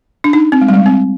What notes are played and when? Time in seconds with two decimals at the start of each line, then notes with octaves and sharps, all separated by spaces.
0.24 D4
0.33 D#4
0.52 C4
0.61 G#3
0.68 G3
0.73 G#3
0.86 C4